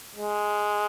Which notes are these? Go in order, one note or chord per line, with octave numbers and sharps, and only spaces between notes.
G#3